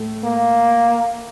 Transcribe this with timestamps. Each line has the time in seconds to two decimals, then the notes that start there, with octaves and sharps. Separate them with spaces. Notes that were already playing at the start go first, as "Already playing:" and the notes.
Already playing: A2 A3
0.24 A#3